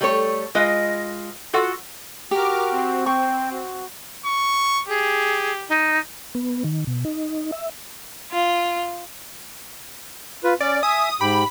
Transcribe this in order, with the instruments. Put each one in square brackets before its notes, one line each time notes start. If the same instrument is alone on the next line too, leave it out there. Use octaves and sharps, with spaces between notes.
[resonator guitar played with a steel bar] G3 A3 A4 C5 C#5
G#3 F4 B4 D#5
F4 F#4 A4 F#5
[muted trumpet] F#4 [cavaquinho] G4 [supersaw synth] A#4 D6 F6
[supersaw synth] C4
[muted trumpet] G5 [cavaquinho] C#6
[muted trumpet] F#4
[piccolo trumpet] C#6
[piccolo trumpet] G4 [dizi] G#4
[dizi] D#4
[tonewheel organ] B3
D#3
B2
D#4
E5
[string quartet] F4
[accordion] F4 B4
[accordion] C#4 [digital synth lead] D5
[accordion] E5 G#5 [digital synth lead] D#6
[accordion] G#2 G4 G5 [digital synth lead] B5